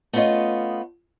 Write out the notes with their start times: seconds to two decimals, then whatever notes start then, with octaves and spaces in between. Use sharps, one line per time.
0.13 A3 B3 C#4 E4 F4 D#5